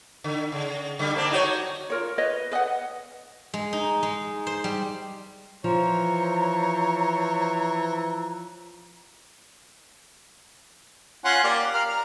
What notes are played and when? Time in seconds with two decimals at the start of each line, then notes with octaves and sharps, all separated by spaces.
0.24 D3
0.52 C#3
0.99 D3 G3
1.14 A#3 C4 D4
1.31 D#4 F#4 C#5
1.90 F4 A#4 C#5
2.18 B4 C#5 D#5
2.52 B4 D#5 F5 F#5
3.54 G#3
3.73 D#4
4.03 G#3
4.47 C5
4.64 G3
5.64 E3 F3 C5 C#5 A#5
11.25 C#4 F4 F#5
11.44 A#3 G4 D5
11.74 A#4 F5
11.88 A#4